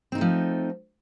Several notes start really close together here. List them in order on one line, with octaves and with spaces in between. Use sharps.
C4 D#4 A3 F3